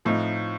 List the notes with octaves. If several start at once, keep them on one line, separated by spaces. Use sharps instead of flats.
A2 F3 C4 D#4